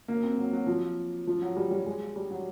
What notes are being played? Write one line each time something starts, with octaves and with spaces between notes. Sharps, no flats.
A#3
C4
F#3
F#3
F3
F3
F#3
G3
G3
G#3
G3
F#3